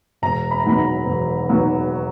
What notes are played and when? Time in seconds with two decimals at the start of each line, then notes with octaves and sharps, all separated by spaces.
0.22 E1 A#5
0.51 B5
0.60 A#5
0.65 D#2 D#3 F#3 B3 B5
0.78 A#5
1.06 E1
1.49 D#2 D#3 F#3 B3